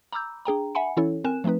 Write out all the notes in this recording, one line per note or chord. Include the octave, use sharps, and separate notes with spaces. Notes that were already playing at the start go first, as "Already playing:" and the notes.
A#5 B5 D6 E6 G6
D4 G#4 G5 A#5
E5 F#5 G#5 B5 C#7
E3 C#4 E4 A4 C#5
C4 A#4 G#5 F#6 E7
F3 A3 C4 D#4 B4